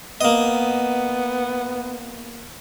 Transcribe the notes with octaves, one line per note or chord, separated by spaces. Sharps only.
A#3 B3 D#5